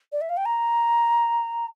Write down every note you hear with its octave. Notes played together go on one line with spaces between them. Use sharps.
D5
E5
F5
G5
A#5